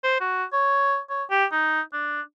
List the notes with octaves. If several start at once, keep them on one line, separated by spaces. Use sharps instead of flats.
C5
F#4
C#5
C#5
G4
D#4
D4